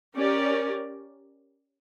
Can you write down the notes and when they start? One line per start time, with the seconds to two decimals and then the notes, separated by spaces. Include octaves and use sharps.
0.15 C#4 G4 A#4 D5